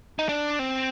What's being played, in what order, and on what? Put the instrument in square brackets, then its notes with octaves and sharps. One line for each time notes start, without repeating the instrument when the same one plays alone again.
[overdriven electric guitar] D#4
D4
C4